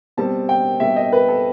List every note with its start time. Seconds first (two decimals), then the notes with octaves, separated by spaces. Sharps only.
0.17 B2 G3 C4 A5
0.49 G5
0.80 B2 G3 C4 E5
0.96 D#5
1.12 B4
1.28 A4